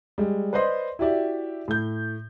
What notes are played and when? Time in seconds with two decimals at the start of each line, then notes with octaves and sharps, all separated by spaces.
0.18 G3 G#3
0.53 B4 C5 D5 D#5 C6
0.99 E4 F#4 G4 D5 E5
1.68 A2 G6